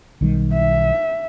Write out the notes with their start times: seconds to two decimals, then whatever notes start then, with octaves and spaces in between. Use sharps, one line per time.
0.21 B1 D#3 G3
0.53 E5